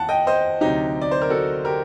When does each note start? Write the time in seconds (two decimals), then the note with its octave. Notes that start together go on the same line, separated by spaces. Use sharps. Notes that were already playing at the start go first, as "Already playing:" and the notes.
Already playing: D#2 F#5 A5
0.09 D#5 G5
0.27 C5 D#5
0.61 D2 C3 F#3 D#4 G4
1.01 D5
1.11 C5
1.21 A#4
1.30 F#4 A4
1.65 G4 A#4